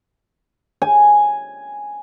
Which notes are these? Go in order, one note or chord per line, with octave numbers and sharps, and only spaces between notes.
G#5